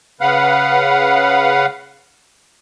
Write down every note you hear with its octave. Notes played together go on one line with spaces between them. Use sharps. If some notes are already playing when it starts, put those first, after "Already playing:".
C#3 B4 F5 F#5